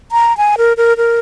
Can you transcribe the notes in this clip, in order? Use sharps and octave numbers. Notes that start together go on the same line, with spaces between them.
A#5
G#5
A#4
A#4
A#4